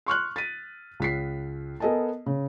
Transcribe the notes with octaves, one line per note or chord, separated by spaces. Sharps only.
C6 C#6 F6 F#6
A6 B6 D#7
C#2 B6 C7
B3 A4 A#4 D#5 G#5 A5
C#3